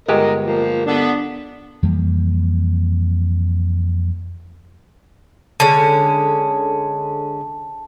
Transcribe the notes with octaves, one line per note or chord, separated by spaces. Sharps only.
G1 G#3 G4 A#4 D#5
F3 A#3
D3 B3 D4
F2 E3 G3 A#3
D3 G#3 C#4 A5